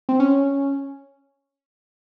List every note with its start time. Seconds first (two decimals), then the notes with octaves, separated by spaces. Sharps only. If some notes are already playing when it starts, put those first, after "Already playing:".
0.09 C4
0.20 C#4